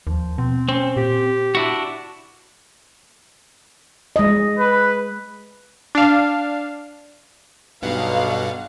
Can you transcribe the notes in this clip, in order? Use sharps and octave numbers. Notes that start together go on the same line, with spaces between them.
D#2 F3
B2 C4
C4 C#4
A#2 G4
D4 E4 F#4
G#3 D#5
B4
D4 F5
B1 G2 B2 F5 F#5